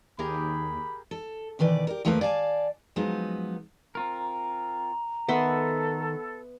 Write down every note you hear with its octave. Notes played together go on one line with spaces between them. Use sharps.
D#2 D#3 G4 G#4 A#4 B5
A4
B2 D#3 E3 B4 D5
G4 A#4
D#2 F3 A3 A#3 A#4 B4
D5 F5 G#5 A5
F3 F#3 G#3 B3 D#4
C4 F4 A#4 A#5
D#3 B3 A4 E5 C6